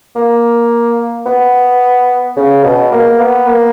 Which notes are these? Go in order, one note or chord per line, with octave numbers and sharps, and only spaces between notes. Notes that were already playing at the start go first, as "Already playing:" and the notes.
A#3
B3
C#3
B2
A#3
B3
A#3